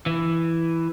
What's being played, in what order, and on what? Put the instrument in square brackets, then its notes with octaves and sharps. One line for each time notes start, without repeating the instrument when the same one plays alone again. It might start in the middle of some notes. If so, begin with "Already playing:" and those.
[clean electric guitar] E3